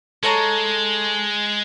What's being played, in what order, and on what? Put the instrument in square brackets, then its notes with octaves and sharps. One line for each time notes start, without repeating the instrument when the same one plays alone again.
[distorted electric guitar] G#3 [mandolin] A4 C#5 A#5